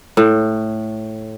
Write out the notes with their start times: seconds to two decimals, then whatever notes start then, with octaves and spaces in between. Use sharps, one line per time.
0.17 A2